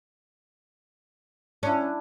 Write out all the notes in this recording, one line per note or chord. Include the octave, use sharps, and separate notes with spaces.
C#4 D4 E4